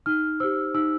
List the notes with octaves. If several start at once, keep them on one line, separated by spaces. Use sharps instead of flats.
D#4 F6
G4 C5 E6
D#4 E6